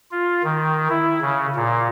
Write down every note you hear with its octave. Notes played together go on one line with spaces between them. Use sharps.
F4
D#3
E4
C#3
A#2